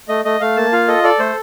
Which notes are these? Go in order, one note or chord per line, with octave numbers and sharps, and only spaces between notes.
A3 D#5
A3 D#5
A3 F5
A#3 A5
F4 F5
A4 D#5
A4 D5
A3 C5